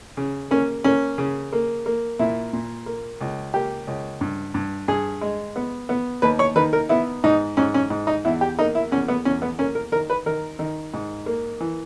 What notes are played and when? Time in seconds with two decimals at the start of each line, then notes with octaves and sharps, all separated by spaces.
0.17 C#3
0.51 A#3 C#4
0.84 A#3 C#4
1.18 C#3
1.53 A#3
1.86 A#3
2.19 A#2 E4
2.53 A#2
2.86 A#3
3.21 C#2
3.54 A#3 G4
3.87 C#2
4.21 G2
4.54 G2
4.88 G2 G#4
5.21 G#3
5.56 B3
5.89 B3
6.22 D#2 B4
6.39 C#5
6.56 D#3 B4
6.73 A#4
6.89 B3 E4
7.24 G#2 D#4
7.57 G#2 C#4
7.74 C#4
7.90 G#2
8.07 D#4
8.25 E2 E4
8.41 G4
8.59 A#3 D#4
8.75 E4
8.91 E2 C#4
9.08 B3
9.25 E2 C#4
9.42 B3
9.59 A#3 C#4
9.75 A#4
9.92 D#3 A#4
10.10 B4
10.26 D#3 A#4
10.59 D#3
10.93 G#2
11.26 A#3
11.60 E3